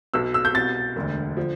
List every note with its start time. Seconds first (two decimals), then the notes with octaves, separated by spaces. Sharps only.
0.14 B1 B2 E6
0.34 E6
0.45 G6
0.55 C2 B2 A6
0.96 E1 D2 D3
1.37 D3 F3